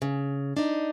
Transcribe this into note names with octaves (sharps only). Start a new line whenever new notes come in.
C#3
D4 D#4